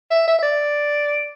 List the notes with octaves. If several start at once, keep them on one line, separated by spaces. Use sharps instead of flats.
E5
E5
E5
D5